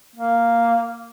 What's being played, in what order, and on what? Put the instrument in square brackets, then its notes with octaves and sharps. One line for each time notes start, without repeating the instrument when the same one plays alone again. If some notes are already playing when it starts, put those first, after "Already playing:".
[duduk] A#3